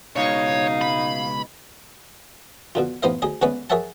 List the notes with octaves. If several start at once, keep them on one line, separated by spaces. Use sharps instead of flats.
C#2 B2 G#3 D#4 C#5 F5
B5
B2 D3 F4
A1 B3 D#4 C5 D#5 F5
D2 G#4 D#5
D3 G#3 A3 B3 C#4 B4
G#4 A#4 C#5 E5 F#5 A5